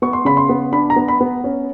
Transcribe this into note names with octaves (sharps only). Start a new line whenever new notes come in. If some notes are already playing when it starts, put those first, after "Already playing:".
B3 C#6
C6
C#3 B5
C6
B3
D4 B5
A#5
B3
B5
B3
C#4